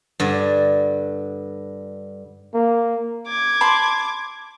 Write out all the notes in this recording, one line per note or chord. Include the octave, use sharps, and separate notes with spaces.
G2 D3
A#3
D6 G#6
A5 B5 C6